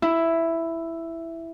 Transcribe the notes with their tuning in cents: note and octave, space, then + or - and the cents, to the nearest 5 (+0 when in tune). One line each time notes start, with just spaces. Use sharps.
E4 +5